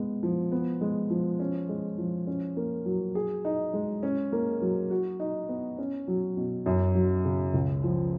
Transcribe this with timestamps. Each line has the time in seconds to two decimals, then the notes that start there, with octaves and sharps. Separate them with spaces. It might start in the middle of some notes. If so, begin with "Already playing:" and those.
Already playing: G#3 B3
0.23 F3
0.52 B3
0.81 G#3
1.10 F3
1.40 C#4
1.69 G#3
1.98 F3
2.27 C#4
2.57 A#3
2.86 F#3
3.15 G#4
3.45 D#4
3.73 G#3
4.03 C#4
4.32 A#3
4.62 F#3
4.90 F#4
5.20 D#4
5.49 B3
5.78 C#4
6.08 F#3
6.37 B2
6.66 F#2
6.95 F#3
7.25 C#3
7.54 C#2
7.83 F3